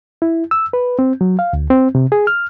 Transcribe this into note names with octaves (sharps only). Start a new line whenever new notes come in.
E4
E6
B4
C4
F#3
F5
D2
C4
C3
G#4
F6